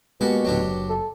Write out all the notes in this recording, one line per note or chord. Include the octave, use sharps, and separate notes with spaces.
B2 G#3 A#3 B3 F#4 G4 A4
D#1 A2 D3 F#3 D4 G4
F#1
A4